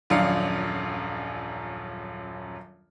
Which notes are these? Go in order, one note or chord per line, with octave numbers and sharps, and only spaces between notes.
D#1 A#1 F#2 D5 F5 C#7